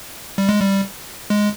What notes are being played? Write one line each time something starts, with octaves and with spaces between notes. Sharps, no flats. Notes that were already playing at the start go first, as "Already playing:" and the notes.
G3
G#3
G3
G#3